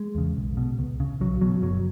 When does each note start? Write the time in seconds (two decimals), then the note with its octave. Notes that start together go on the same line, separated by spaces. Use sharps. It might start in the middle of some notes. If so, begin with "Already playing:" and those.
Already playing: G#3
0.15 E2 C#3
0.37 B1
0.57 B2
0.79 C#2
1.00 C#3
1.21 B1 F#3
1.41 B2 F#3
1.62 F#1 F#3